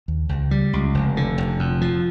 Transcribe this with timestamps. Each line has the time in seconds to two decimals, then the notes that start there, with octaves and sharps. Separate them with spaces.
0.08 D#2
0.29 C#2
0.51 G3
0.73 C#2
0.94 F1
1.17 D3
1.38 F1
1.59 F2
1.81 F3